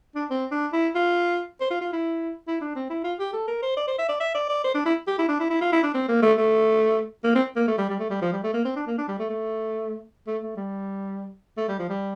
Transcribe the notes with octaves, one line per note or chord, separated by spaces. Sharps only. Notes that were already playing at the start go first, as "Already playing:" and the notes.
D4
C4
D4
E4
F4
C5
F4
F4
E4
E4
D4
C4
E4
F4
G4
A4
A#4
C5
D5
C5
E5
D5
E5
D5
D5
C5
D4
E4
G4
E4
D4
E4
E4
F4
E4
D4
C4
A#3
A3
A3
A#3
C4
A#3
A3
G3
G3
A3
G3
F3
G3
A3
A#3
C4
D4
A#3
D4
G3
A3
A3
A3
A3
G3
A3
G3
F3
G3